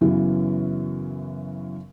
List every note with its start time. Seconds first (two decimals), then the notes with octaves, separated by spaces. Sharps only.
0.01 F#2 C#3 E3 F#3 B3